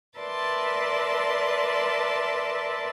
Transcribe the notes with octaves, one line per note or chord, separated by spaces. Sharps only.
A#4 B4 D5 E5 A5 C6